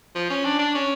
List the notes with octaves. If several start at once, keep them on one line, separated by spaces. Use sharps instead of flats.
F3
C#4
D4
D4
C#4